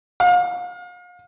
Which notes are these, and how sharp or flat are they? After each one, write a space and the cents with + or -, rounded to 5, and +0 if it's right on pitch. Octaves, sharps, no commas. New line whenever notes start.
F5 +40